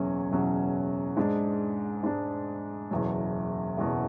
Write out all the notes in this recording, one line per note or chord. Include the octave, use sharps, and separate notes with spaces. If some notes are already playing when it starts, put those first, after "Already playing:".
Already playing: F#1 E2 B2 F#3 C#4
F#1 E2 B2 F#3 C#4
G#2 G#3 D4
G#2 G#3 D4
F#1 E2 B2 F#3
F#1 E2 B2 F#3